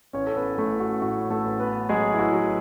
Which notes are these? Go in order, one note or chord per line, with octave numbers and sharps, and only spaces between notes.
A1 C#4 C#5
A4
B3 B4
A1 A3 A4
F#4
A2 F#4
A3 A4
A1
B3 B4
F#3 G#3 G#4
E4
F#4
F#3